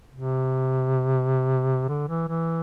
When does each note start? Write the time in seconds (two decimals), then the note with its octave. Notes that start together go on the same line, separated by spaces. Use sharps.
0.15 C3
1.89 D3
2.09 E3
2.29 E3